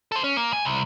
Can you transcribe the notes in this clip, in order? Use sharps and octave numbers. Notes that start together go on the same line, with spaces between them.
A4 C5
C#4
A#3
F#2 G#5
C2